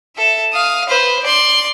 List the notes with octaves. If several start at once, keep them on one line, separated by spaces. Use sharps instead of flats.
A4 E5
F5 D#6
B4 C5
D5 C6